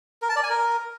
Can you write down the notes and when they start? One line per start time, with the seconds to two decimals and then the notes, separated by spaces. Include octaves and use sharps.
0.22 A#4
0.29 A5
0.36 D5
0.43 G#5
0.50 A#4